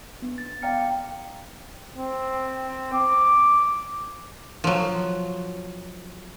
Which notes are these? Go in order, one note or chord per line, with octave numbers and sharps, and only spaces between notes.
B3 D4
A6
D5 F5 G5 A#5 F6 C#7
C4
D6
F3 F#3